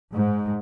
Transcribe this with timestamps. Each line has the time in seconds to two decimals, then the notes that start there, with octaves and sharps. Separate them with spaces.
0.14 G#2